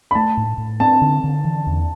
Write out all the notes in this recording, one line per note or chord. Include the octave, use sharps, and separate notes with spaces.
B5
A3 A5
A2
A2
C4 A5
D3
D3
E3
E2